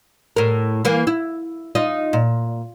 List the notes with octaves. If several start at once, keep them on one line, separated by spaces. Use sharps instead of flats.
A2 A#4
E3 A#3
E4
D#4 F4 D#5
A#2